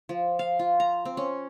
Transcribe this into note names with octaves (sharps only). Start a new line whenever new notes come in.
F3
F5
F4
A#5
C4
C#4